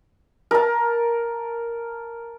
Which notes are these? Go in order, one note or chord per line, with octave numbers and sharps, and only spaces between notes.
A#4 A5